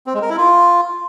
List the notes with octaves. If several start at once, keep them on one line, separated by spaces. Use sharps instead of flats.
C4
G#3
A#4
E4
F4